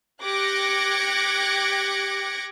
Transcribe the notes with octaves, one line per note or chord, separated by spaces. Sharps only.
G4 D6 F#6 G#6 A#6 C#7